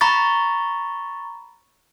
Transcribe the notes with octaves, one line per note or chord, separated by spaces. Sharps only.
A#5 B5 C#6 A6